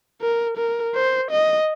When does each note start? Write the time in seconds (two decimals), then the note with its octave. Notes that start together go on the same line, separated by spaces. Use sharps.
0.21 A#4
0.57 A#4
0.95 C5
1.31 D#5